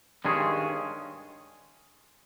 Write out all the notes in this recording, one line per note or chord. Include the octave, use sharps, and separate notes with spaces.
G2 D#3 G#3 C#4 G#4